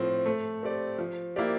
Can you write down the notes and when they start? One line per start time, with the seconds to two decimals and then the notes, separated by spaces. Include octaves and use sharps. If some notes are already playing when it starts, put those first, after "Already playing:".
Already playing: A2 F3 C4
0.26 A3
0.63 C4 G4 D5
0.98 F3
1.36 A#3 E4 G4 D5